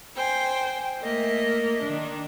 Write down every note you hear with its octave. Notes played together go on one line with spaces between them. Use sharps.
C5 G5 G#5
A3 A#3 D#5 E5
D#3 D4